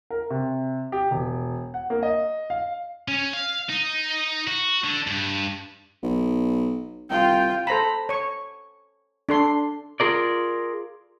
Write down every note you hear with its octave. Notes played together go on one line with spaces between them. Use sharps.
A#4
C3
G4
E1
F#5
A#3
D#5
F5
C#4
F5
D#4
F#4
D3
G2
B1
C2 F4 G5
A4 C5 A#5 B5
C#5 C#6
D4 A4 C6
F4 G#4 A#4 D5